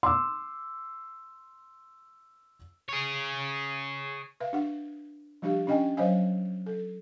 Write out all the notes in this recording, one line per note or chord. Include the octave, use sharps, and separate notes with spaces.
C6 D6 E6
G#4 C#5
B4 E5 F5
D4 F#5
F3 G3 D4 G4 F5
C#4 D4 D#5 G5 G#5
F#3 C5 C#5 D#5 F5 G#5
A4